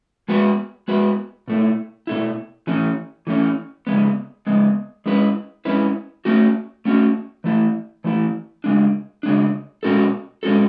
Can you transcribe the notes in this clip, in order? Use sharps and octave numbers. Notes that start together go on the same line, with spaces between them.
G#3 B3 F#4 B4
G#3 B3 F#4 B4
B2 A3 E4
B2 A3 E4
E3 A3 C#4
E3 A3 C#4
C#3 G#3 B3
C#3 G#3 B3
G#3 C#4 E4 B4
G#3 C#4 E4 B4
A3 C#4 F#4
A3 C#4 F#4
E3 A3 E4
E3 A3 E4
C#3 G#3 D4
C#3 G#3 D4
B2 G#3 C#4 F#4 A4
B2 G#3 C#4 F#4 A4